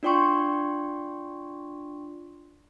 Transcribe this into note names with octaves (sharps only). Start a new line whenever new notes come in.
D4 F4 D5 G5 C6 C#6